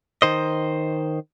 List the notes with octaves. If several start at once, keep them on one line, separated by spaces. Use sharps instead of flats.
D#3 C5 D#5